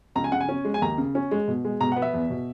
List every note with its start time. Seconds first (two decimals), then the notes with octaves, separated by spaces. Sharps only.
0.15 C#2 A#5
0.24 G#5
0.32 C#3 F#5
0.41 G#5
0.49 C#4
0.65 G#3
0.74 G#5
0.82 D#2 A#5
0.98 C#3
1.15 C#4
1.31 G#3
1.48 B2
1.65 G#3
1.81 B2 A#5
1.92 B3 F#5
2.02 E5
2.14 E2
2.30 B2